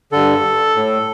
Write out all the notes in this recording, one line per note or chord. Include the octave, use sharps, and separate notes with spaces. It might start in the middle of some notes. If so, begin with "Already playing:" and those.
G2 D3 A4
A2